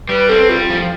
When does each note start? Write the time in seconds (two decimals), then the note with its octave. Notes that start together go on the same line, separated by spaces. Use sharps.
0.09 G3 B4
0.29 C4 A4
0.50 G3 F4
0.70 F3